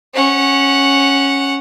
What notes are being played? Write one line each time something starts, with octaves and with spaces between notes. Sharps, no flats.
C#4 F#5